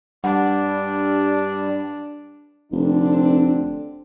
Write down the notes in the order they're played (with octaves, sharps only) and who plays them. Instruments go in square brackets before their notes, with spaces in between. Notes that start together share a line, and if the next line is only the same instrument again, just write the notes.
[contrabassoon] G2 [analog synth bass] G3 [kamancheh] D4 [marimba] F#5
[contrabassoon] F1 [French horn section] D3 C4 D4